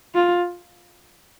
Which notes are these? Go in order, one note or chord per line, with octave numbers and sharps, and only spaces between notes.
F4